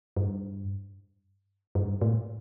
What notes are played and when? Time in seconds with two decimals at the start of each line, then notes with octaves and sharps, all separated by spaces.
0.17 G2
1.75 G2
2.01 A2